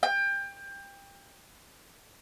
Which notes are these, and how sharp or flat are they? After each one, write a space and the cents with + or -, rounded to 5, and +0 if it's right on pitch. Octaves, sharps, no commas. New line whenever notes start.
G5 +25